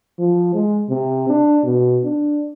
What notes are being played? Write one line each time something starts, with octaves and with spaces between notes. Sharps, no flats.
F3
G#3
C3
D4
B2
D4